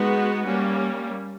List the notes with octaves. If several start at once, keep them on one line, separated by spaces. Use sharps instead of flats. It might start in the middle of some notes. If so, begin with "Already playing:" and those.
Already playing: G#3 B3 D#4 F#4 B4
G3 A#3 C#4